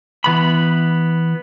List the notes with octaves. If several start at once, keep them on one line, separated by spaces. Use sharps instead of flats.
E3 B3 B5